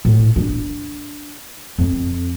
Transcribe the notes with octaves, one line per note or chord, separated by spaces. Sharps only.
A2
D4
F2